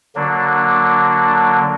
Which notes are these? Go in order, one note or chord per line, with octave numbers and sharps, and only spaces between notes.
D3 F#3 A#3 D4